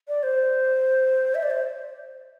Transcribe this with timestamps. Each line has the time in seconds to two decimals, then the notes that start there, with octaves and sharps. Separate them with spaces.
0.08 D5
0.23 C5
1.35 E5
1.43 D5
1.50 C5